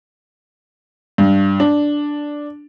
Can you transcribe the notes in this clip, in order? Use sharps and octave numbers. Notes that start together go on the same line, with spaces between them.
G2
D4